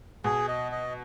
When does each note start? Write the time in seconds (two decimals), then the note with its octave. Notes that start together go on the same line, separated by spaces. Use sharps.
0.24 B2 G#4
0.48 D#5
0.72 D#5